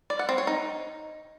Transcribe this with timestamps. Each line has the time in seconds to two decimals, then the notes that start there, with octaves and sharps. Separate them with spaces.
0.10 D5
0.19 F#5
0.29 C4
0.38 C#5
0.47 D#4